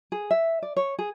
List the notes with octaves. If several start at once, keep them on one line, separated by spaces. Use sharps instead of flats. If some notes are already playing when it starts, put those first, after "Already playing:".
G#4
E5
D5
C#5
G#4